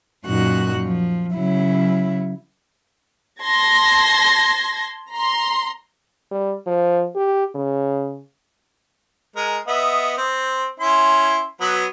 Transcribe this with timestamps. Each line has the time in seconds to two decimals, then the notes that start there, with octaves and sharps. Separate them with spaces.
0.25 F#2 A#2 D#4 F#4 F#6
0.83 F3
1.35 C#3 F#3 E4
3.41 A5 C6 G#6 A#6
5.11 A#5 C6
6.31 G3
6.67 F3
7.16 G4
7.55 C#3
9.36 G#3 A#4
9.68 B3 D#5 E5
10.17 C4
10.80 C#4 E4 C6
11.61 F#3 B3 B4